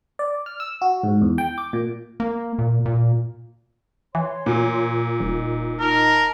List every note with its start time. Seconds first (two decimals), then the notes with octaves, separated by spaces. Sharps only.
0.19 D5
0.46 F6
0.60 E6
0.82 F#4
1.03 G#2
1.22 E2
1.38 G5
1.58 D6
1.73 A#2
2.20 A#3
2.59 A#2
2.86 A#2
4.15 E3 C#5 C6
4.46 A#2
5.20 D#1 D#4
5.80 D#4 A#4 A5